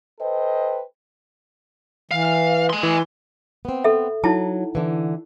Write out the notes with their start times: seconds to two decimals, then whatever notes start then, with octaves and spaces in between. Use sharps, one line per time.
0.20 A4 B4 C5 D#5 G5
2.11 E3 F5
2.70 G#5 C6
2.83 E3
3.65 B3 C4
3.84 A4 E5
4.24 F#3 D#4 E4 A5
4.75 D3 E3